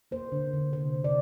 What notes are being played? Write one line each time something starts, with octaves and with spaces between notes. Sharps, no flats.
A#3 C5
D3
D3
C3 C5
C3
D5